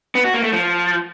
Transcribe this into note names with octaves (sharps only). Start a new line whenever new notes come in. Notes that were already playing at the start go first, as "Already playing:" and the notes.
B3
F#4
A#3
A3
F3